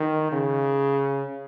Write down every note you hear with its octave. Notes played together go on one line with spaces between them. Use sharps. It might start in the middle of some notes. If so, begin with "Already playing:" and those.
Already playing: D#3
C#3